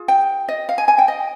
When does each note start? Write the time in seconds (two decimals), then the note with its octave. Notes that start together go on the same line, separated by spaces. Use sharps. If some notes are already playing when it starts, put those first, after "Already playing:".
Already playing: F4 G#4
0.08 G5
0.49 D#5
0.69 F5
0.78 G#5
0.88 G#5
0.98 G5
1.08 D#5